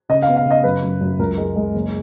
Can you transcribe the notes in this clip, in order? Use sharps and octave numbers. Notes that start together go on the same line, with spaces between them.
C#3 D#5
F5
B3
F5
C#3
D#5
F#2 B4
F#2
F#2
C#2 A#4
G#3
G#3
F#1